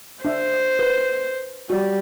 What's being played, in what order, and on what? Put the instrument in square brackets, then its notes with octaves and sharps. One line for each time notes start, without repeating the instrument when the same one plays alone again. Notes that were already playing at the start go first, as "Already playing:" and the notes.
[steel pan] D4 E5 [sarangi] C5
[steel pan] B4
[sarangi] G3 [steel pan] F#4 D5